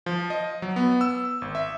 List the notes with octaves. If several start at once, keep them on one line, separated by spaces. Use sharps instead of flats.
F3
D#5
F#3
B3
E6
G#1
E5